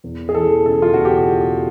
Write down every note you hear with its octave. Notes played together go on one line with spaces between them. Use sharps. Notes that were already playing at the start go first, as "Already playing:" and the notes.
E2
G#4
E3 A4
C#3 A4
F4
E2 F#4
G4